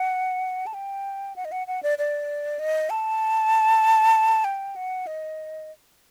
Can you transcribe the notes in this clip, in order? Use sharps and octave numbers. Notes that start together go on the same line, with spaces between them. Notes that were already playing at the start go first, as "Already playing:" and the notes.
Already playing: F#5
A5
G5
F#5
D#5
F#5
F#5
D5
D5
D#5
A5
G5
F#5
D#5